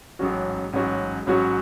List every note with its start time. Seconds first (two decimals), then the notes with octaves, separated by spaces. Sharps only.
0.19 A1 G#2 F#3 C#4 F#4
0.73 A1 G#2 F#3 C#4 F#4
1.26 A1 G#2 F#3 C#4 F#4